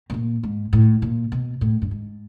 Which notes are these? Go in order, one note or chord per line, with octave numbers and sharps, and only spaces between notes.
B2
A#2
G#2
A2
A#2
B2
A2
G2
G#2